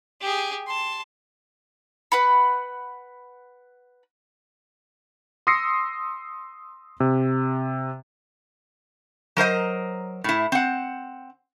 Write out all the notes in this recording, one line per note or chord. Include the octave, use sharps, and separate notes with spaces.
G4 G#4
A5 C6
B4 F#5 B5
C6 D#6 E6 A#6 C7 C#7
C3
F#3 A#4 C5 D#5
A2 E4
C4 F#5